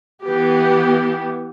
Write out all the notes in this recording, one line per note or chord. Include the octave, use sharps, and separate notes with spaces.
E3 B3 G4